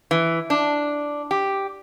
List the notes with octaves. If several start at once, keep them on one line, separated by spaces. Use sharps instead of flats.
E3
D4
G4